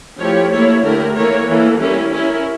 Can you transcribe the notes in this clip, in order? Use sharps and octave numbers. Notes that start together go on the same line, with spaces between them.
F3 A3 E4 G4 C#5
A#3 E4 A4 C#5
D3 A3 E4 G4 A#4
E3 A#3 E4 A#4 C#5
E3 A#3 E4 A4
G3 C#4 E4 A#4
C#4 E4 A#4